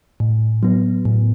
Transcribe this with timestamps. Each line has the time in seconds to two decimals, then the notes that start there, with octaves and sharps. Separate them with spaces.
0.20 A2
0.63 F#3 B3
1.05 A2